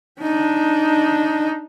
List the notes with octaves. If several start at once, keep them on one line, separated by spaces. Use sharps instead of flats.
D4 D#4